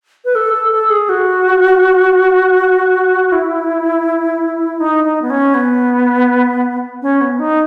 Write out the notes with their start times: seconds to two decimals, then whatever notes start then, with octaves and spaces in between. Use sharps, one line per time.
0.25 B4
0.35 A4
0.54 A4
0.72 A4
0.90 G#4
1.09 F#4
3.32 E4
4.80 D#4
5.04 D#4
5.22 B3
5.30 C#4
5.54 B3
7.02 C#4
7.21 B3
7.39 D#4